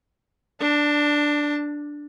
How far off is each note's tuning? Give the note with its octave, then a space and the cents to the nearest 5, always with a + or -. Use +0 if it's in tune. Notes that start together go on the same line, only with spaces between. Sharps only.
D4 +0 A5 +25